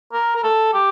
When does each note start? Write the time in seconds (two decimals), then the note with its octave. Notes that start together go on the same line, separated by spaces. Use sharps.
0.13 A#4
0.36 A#4
0.43 A4
0.73 G4